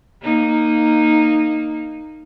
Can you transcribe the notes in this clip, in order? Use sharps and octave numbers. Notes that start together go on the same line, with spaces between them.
A#3 D#4